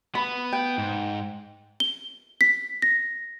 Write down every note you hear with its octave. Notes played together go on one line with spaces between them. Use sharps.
B3 B5
G5
G#2
G7
B6
A#6